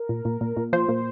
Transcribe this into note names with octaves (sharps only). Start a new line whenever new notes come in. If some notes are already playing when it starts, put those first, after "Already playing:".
Already playing: A#4
A#2
A#2
A#2
A#2
F3 C5
A#2